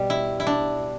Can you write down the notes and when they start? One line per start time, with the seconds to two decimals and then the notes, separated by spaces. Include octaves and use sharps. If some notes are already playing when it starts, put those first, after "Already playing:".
Already playing: B2 G3
0.10 E4
0.40 E4
0.47 D4